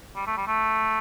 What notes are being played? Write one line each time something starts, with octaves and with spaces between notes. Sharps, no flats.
G3
A3
G3
A3